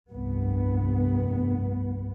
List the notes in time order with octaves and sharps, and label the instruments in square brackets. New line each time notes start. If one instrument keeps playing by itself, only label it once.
[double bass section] F1 C2 G2 B3